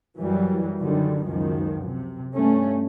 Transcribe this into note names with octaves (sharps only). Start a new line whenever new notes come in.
F#2 E3 F#3 G3
F#2 D3 D#3 G3
C#2 F#2 D#3 F3
C3
G2 A3 C#4